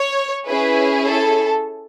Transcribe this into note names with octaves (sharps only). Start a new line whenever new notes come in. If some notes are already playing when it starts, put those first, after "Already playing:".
Already playing: C#5
C#4 E4 G#4 B4
A4